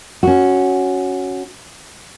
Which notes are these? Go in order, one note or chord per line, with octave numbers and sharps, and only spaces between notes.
C#4 F#4